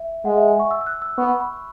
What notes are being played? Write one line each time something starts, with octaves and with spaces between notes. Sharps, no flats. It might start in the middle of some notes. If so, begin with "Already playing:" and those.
Already playing: E5
G#3 F#5
E5
G#5
C#6
E6
E6
F#6
E6
B3 C#6
B5